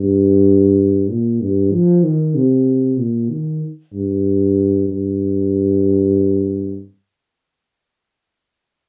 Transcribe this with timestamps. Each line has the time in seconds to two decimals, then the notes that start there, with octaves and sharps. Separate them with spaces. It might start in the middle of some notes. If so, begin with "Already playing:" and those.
Already playing: G2
1.10 A#2
1.41 G2
1.72 F3
2.04 D#3
2.35 C3
2.99 A#2
3.30 D#3
3.93 G2
4.88 G2